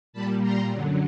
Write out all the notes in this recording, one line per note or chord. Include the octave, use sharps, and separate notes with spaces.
A#2 G3 A5 B5
A#5 C6
F#2 D3 F#3